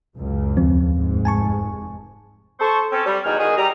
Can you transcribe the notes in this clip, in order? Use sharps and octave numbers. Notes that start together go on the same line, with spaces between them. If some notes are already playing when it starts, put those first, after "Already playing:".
C#2 F#2 C#3
D#2 F3 C4
F1 G#2
G#5 A5 C#6
A4 C5 C#6
C4 C#4 A4
G3
E2 D#4 F#4 G5 G#5 F6
D#3 G#3 F#4 G#4
G3 A#5